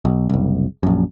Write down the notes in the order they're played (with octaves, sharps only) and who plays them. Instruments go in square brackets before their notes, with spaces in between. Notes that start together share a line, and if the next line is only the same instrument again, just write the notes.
[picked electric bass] B1
F#1 C2
A#1 F#2